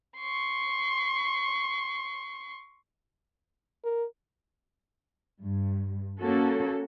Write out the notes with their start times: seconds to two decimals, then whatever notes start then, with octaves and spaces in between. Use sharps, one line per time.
0.17 C6 C#6
3.84 A#4
5.41 G2
6.20 A#3 C#4 F#4 A4